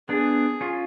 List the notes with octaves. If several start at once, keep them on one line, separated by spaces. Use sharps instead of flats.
B3 D4 G#4
C#4 F4